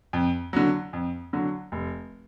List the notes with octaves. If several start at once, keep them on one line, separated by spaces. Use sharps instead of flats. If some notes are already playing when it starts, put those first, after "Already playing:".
F2
D3 F#3
F2
D3 F#3
F1